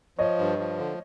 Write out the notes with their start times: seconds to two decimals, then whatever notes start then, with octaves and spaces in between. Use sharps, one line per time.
0.19 F3 C#5 D#5
0.39 G2
0.58 F3
0.78 D3